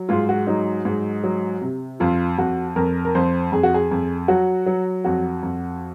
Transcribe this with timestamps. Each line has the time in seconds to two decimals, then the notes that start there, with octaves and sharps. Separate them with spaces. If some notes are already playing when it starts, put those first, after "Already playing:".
Already playing: F#3
0.09 G#2 F4
0.29 F#4
0.47 F#3 D#4
0.85 G#2
1.24 F#3
1.62 C3
2.00 F2 F4
2.38 F2 F#4
2.76 F2 A#4
3.05 A#4
3.15 F2 C5
3.52 F2 G#4
3.63 F#4
3.74 G#4
3.91 F2
4.28 F#3 F#4
4.66 F#3
5.04 F2 F#4
5.43 F2